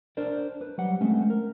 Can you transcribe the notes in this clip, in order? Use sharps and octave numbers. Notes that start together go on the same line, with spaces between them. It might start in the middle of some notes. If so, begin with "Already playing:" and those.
D4 A#4 C5 D5
B4
F#3 G3 F#5
G#3 A3 C4 C#4
A#4